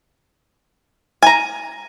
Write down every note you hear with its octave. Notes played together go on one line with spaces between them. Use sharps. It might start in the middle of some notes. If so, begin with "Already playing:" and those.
G#5 A#5